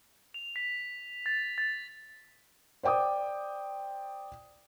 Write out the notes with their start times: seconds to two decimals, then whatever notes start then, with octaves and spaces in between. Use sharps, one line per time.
0.34 F7
0.56 B6
1.26 A6
1.58 A6
2.83 C5 D5 G5 D6 D#6